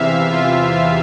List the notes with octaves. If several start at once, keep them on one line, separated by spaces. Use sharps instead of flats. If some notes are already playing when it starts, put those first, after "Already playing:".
Already playing: E2 C3 E3 E5 F5
F4
F4